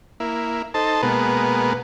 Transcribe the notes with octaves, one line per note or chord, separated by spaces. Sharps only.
A#3 E4
D#4 A4 C5 A5
B2 G#3 A#3 B3